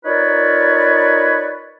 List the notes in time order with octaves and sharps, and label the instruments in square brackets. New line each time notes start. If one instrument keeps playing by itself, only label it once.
[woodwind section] D#4 F4 A#4 B4 C#5 D5